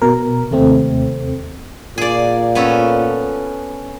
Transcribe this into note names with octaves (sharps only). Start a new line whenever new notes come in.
B2 A#4
D#2 C3 A3 C4
A#2 G#4 D5
B3 C#4 A4